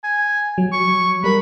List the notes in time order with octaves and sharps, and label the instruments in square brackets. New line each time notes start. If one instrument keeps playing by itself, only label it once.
[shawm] G#5
[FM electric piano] F#3
[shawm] C#6
[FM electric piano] G3 A#4 [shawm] B5